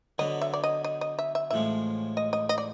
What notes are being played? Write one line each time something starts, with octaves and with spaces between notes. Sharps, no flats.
D3 F#3 B3 D#5
E5
D5
D#5
D#5
D#5
E5
E5
A1 A2 F3 G#3 E5
D#5
D#5
D#5
D5